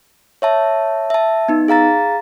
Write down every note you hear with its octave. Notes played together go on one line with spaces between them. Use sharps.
C#5 E5 A5
E5 A5
B3 D#4
G#4 F5 A#5 A6